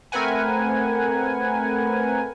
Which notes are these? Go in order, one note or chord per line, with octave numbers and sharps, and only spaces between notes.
A3 C4 A#4 B4 F#5 G#5